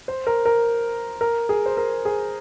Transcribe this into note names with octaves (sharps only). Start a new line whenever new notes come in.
C5
A#4
A#4
A#4
G#4
C5
A#4
G#4